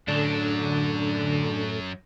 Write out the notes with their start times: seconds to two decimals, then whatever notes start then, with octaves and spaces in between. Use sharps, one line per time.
0.08 F#2 A2 D3 F#3 D4 A4